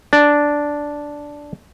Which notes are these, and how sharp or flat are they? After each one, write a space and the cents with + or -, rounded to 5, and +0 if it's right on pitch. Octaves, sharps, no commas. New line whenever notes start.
D4 -5